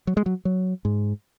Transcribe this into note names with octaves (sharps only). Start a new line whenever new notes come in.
F#3
G#3
F#3
F#3
G#2